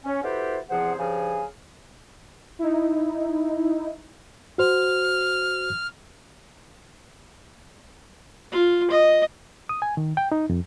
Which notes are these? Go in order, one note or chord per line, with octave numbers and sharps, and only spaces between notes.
C#4
E4 F#4 G4 A4 B4 C5
E2 C3 F3 G#4 C5 F#5
G2 C#3 F3 G#4 F5 G#5
D#4 E4
F#4 C5 F6
F4
D#5
D#6
G#5
D#3
G5
D#4
F2